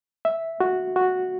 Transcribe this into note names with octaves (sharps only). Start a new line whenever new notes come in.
E5
F#4
F#4